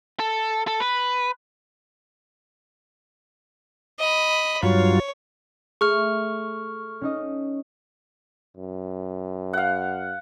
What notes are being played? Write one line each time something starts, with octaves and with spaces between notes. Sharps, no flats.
A4
A4
B4
D#5 B5
G2 F#3 F4 C#5
A3 G#4 C#6 F6
C#4 D#4 D#5
F#2
F5 F#5